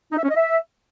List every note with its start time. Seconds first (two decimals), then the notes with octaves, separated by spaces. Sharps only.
0.12 D#4
0.18 E5
0.24 C#4
0.30 D#5
0.36 E5